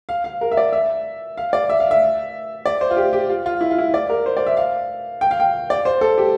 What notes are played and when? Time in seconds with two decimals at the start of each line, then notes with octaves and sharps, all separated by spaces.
0.09 F5
0.24 F5
0.41 A#4
0.51 E5
0.57 D5
0.73 E5
1.37 F5
1.53 D5
1.70 E5
1.80 F5
1.91 E5
2.66 D5
2.81 C5
2.91 F4
2.97 G4
3.13 G4
3.30 F4
3.46 F4
3.61 E4
3.71 F4
3.78 E4
3.94 D5
4.10 A#4
4.26 C5
4.37 D5
4.46 E5
4.57 F5
5.21 G5
5.31 F5
5.40 G5
5.70 D5
5.85 C5
6.01 A4
6.18 G4